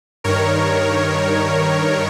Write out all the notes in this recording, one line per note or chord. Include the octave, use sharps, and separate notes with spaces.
G2 D#3 A#4 C#5